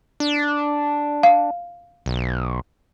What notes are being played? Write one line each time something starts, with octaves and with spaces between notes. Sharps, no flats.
D4
F5
B1